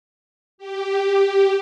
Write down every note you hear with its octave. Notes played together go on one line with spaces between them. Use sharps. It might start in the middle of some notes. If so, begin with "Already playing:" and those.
G4